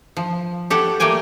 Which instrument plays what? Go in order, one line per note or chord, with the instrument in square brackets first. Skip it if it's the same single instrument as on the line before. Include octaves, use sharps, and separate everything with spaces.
[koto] F3
G4 A4 C#5 F#5
G3 A3 A#3 G5 G#5